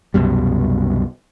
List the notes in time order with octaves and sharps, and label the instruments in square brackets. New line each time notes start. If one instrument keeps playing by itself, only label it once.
[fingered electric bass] C2 F#2 B2 G3